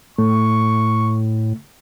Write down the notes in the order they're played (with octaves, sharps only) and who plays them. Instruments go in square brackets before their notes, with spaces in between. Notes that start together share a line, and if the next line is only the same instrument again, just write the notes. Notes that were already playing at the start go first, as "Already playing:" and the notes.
[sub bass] A2 [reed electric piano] A3 [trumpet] C#6